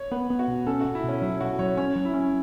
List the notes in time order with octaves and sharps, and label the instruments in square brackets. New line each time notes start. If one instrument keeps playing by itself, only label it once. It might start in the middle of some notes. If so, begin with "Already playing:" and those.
Already playing: [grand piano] C#5
[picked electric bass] B3 [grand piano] B4
[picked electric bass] B3
[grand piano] F#4
[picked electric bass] B2
[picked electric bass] C#4 [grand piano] A4
[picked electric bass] B2 [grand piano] F#4
[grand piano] E4
[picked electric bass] B2 [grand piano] C#4
[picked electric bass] F#3 [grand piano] E4
[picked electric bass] B2 [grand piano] F#4
[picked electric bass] F#3 [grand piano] C#5
[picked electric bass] C#4 [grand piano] C#5
[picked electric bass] F#3
[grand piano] E4
[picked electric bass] C#4